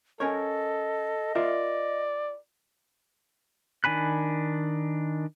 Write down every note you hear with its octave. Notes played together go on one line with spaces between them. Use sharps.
C#4 A4 A#4 C#5 D#5
F4 A#4 D5 E5
D#3 D4 G#5 B5 F#6